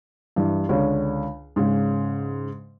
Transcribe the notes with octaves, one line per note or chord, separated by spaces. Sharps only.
G2 E3
C#2 D3 C#5
G#2 C#3